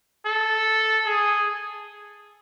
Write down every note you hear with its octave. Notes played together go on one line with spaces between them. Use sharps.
A4
G#4